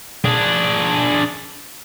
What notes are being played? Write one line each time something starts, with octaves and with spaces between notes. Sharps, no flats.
D4 G#4